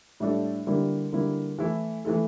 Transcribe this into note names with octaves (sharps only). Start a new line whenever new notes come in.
A2 G3 D4 A4
D3 G3 A#3 E4
D3 G3 A#3 E4
E3 A3 E4 A4
E3 A3 E4 A4